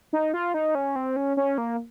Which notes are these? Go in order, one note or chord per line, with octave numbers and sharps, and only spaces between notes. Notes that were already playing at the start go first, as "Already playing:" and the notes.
D#4
F4
D#4
C#4
C4
C#4
C#4
A#3